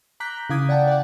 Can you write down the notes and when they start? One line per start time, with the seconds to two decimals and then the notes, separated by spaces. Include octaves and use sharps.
0.20 A#5 D6 F#6 G6 B6
0.50 C#3 E3 F5 D6 D#6 G#6
0.69 D5 F#5 G5 A5
0.87 D5 F#5